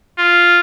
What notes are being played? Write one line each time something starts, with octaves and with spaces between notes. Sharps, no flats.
F4